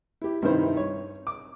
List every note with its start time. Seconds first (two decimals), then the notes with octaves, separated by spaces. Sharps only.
0.22 E4 G4
0.42 G2 C3 D#3 D#4 E4 C5
0.77 C#5
1.27 D6